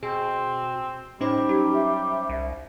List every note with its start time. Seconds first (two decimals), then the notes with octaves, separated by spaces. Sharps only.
0.03 B2 C4 G#4
1.21 A2 G3 C#4 D#4 C5
1.49 F#3 G4
1.74 E5
2.29 C2